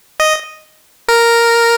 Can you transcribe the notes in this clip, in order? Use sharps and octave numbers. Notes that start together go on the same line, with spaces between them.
D#5
A#4